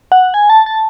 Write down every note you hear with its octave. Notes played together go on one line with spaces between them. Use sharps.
F#5
G#5
A5
A5